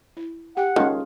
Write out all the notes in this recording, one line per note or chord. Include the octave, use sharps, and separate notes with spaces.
E4
G4 F#5 G5
D#3 G#3 C#4 F4 A5